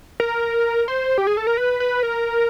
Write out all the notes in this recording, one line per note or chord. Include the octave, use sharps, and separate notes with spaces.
A#4
C5
G4
G#4
A4
A#4
B4
B4
A#4